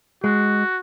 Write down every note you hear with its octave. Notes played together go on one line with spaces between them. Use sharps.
G#3 F#4